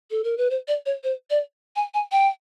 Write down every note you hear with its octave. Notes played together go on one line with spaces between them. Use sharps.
A4
A#4
B4
C5
D5
C#5
C5
D5
G#5
G#5
G5